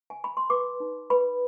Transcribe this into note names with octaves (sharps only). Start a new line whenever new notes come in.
G#5
B5
C6
B4 D6
D#4
B4 B5